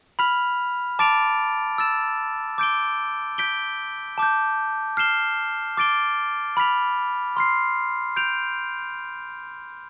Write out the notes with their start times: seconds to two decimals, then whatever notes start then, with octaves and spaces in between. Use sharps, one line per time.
0.19 B5 F6 B6 F7
0.99 A5 D6 A6 D7 F7
1.78 E6 A6 E7
2.58 D6 G6 D7 G7
3.38 G6 B6 D7 G7
4.18 A5 D6 G6
4.97 F6 C7 E7 G7
5.77 D6 A6 D7 G7
6.57 B5 F6 B6 F7
7.37 C6 F6 C7
8.16 G6 D7 F7